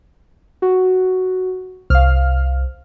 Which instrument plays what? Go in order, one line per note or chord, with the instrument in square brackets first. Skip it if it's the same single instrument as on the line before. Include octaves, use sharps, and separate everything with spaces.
[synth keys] F#4
[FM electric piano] C2 [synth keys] F5 F6